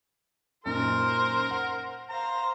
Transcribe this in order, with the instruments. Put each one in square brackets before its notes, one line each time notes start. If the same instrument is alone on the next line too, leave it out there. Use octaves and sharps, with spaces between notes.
[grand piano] F#2 A#2 D#4 [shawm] A#4 [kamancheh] C5
[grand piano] F#5
[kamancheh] C5 F5 [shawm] A#5